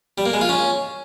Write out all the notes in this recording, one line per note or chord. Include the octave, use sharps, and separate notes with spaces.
G3
A#3
G#3
F4
C#4